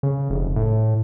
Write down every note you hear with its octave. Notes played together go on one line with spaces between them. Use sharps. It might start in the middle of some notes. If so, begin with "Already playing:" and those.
C#3
F1
A2